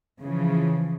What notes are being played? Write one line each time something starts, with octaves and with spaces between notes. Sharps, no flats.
C#3 E3 F3